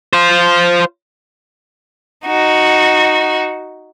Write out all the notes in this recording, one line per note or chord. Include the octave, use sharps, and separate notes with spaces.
F4 C5
D#4 F#4